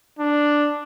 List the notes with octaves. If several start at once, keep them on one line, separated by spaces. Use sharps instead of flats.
D4